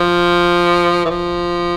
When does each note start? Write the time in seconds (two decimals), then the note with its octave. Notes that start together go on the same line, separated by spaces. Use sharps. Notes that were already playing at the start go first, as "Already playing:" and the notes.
Already playing: F3
1.05 E3
1.10 F3